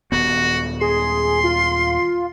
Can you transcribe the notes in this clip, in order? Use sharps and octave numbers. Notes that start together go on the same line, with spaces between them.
D#1 B3 F#4
G#4 C6
F4